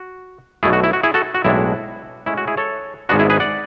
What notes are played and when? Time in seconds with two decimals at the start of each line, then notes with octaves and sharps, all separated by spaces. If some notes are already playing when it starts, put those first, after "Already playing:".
Already playing: F#4
0.63 B1 B2 A3 D4 E4 G#4
0.73 F#4
0.83 E4
0.93 F#4
1.03 E4 G#4
1.14 F#4 A4
1.34 F#4
1.45 B1 A2 G#3 D4 E4
2.26 A2 G#3 C#4 E4
2.37 F#4
2.47 E4 G#4
2.57 A4 C#5
3.09 G#1 G#2 G#3 B3 D4 F#4
3.19 E4 G#4
3.30 G#4 B4
3.40 D5 F#5